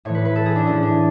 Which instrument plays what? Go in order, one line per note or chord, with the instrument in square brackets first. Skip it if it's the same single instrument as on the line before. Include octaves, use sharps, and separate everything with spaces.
[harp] A2 E3 C#5
B4
B4
A4
G#4
D4
A2 E3 C#4
D4